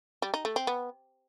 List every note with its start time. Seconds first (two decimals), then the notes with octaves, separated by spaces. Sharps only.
0.22 G3
0.34 D#4
0.45 A3
0.56 C4
0.67 B3